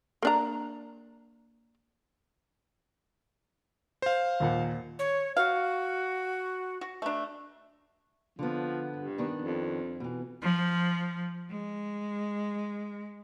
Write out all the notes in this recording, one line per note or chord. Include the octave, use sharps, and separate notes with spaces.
A#3 D4 A#5
C5 F5
D#2 A#2 F#5
C#5
F#4 F5
F#4
A3 D4
D3 F3 B3
G2
D#3 B3 D4
F2
B2 E3
F3
G#3